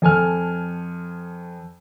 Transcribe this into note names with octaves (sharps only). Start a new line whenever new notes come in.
F2 A4 G#5 F6